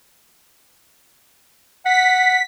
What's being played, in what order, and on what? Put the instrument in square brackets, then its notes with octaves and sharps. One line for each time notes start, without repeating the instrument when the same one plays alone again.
[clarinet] F#5 [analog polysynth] B6